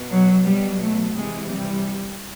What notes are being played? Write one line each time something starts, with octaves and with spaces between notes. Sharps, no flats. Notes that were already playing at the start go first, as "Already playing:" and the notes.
Already playing: B2
F#3
B2 F#3 G3
A3
C3 E3 G#3
G3